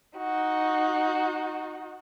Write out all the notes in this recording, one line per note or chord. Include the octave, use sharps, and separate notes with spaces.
D#4 F#4